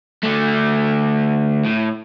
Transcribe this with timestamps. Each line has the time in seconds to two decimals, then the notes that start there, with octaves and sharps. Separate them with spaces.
0.23 D3 A3
1.65 A2